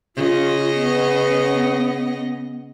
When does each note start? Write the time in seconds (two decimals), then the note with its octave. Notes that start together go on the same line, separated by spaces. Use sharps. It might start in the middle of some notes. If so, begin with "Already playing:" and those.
0.16 C#3 F4 D#5
0.74 B3